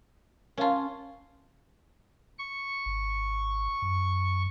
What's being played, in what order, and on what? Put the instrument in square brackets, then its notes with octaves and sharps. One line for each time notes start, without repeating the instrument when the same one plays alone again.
[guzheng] C#4 F4 [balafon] A#4 F5 A5
[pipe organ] C#6
[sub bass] G#1
F#2